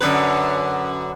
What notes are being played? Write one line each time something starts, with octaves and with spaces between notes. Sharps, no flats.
F#2 D3 B4